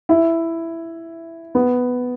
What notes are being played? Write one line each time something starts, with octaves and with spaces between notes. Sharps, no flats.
E4
B3